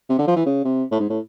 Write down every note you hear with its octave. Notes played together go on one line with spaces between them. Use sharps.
C3
D3
F3
E3
C#3
C3
A2
G#2
A2